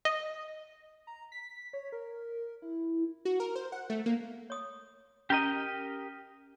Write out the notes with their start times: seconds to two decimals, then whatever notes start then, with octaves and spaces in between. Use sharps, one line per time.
0.05 D#5
1.07 A#5
1.32 B6
1.73 C#5
1.92 A#4
2.62 E4
3.25 F#4
3.40 A#4
3.56 C5
3.72 F#5
3.90 A3
4.06 A#3
4.50 C#5 D#6
5.30 C#4 G4 A#4 D#5 A#5